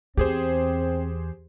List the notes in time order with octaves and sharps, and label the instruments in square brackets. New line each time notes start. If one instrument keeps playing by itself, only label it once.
[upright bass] E2 [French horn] C4 [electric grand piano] G4 G#4 C5